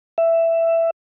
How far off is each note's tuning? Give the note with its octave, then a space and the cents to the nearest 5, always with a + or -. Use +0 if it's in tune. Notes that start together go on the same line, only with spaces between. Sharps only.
E5 +10